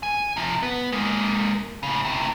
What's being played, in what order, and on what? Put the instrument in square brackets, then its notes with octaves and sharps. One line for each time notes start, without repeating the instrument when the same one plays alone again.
[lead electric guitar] G#5
C3 F3
B3
G#3 A#3
A2 C#3
A2 C3